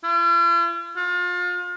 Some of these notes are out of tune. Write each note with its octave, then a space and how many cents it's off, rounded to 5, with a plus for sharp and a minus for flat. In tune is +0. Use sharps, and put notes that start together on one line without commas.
F4 -45
F4 +35